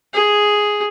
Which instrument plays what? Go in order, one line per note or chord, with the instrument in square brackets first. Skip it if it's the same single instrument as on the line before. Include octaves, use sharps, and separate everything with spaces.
[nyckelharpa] G#4